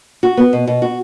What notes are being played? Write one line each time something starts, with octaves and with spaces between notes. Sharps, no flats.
F#4
B3
B2
B2
F#4